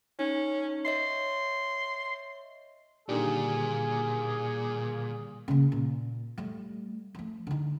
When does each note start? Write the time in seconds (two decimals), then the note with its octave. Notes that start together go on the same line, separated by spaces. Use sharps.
0.19 C#4 D#4
0.85 C#5 D#5 E5 C6
3.09 A#2 D3 D#3 G3 G#4
5.48 C#3 A#3
5.72 A#2
6.38 G3 A3
7.15 F3 A3
7.47 D3 D#4